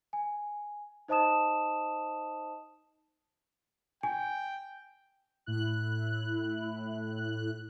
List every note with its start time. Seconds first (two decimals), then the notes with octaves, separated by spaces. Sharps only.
0.13 G#5
1.08 D#4 C5 D#5 A5 D#6 E7
4.03 G5 G#5
5.46 A2 E4 F#6